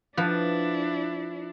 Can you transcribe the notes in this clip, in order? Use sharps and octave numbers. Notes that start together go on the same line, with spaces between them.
F3 D4 E4 B4